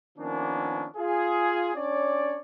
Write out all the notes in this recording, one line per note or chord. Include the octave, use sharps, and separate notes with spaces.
D#3 F3 A#3 B3 C#4 D4
F4 G#4
C#4 D4 C#5 D5